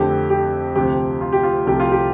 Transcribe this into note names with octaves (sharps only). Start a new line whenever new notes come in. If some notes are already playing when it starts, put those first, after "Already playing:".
Already playing: F2 D3 A3 G4
G4
D2 C3 F3 G4
F4
G4
F4
C2 C3 F3 A3 G4
F4
G4